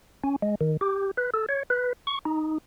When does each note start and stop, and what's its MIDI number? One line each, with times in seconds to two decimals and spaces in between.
0.24 0.36 61
0.42 0.55 56
0.61 0.77 51
0.81 1.11 67
1.17 1.30 71
1.34 1.46 69
1.49 1.63 73
1.70 1.93 71
2.07 2.19 85
2.25 2.58 63